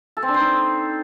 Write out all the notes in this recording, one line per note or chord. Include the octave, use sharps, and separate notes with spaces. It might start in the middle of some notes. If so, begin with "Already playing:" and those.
A4
C4
D4
C5
D#4